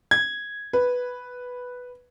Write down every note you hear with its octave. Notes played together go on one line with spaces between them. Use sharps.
G#6
B4